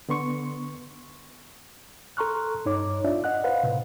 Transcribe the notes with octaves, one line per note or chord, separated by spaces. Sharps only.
D3 B3 C6 C#6
A4 A#5 C6 C#6 F6 F#6
G2 D#4 C#5 D6
D4 F4 D5 E5
D#5 F#5 F#6
B4 C5 F5 F#5
A2 C3